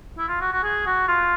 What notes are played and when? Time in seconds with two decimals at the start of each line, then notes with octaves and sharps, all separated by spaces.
0.18 E4
0.29 F4
0.41 F#4
0.52 F#4
0.64 G#4
0.86 F#4
1.08 F4